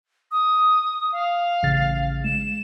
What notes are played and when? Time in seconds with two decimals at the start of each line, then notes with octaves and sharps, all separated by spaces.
0.31 D#6
1.12 F5
1.63 A1 C#3 A6
2.24 G#3 E7